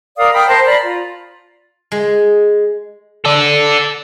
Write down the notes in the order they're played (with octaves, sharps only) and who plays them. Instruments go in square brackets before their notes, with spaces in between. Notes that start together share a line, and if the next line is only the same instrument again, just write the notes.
[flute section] A#4 D5 F5 D#6
G5 B5 D#6 F6
A#4 C5 A5 C6
D5 A#5 B5
F4
[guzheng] G#3
[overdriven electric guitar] A4 D5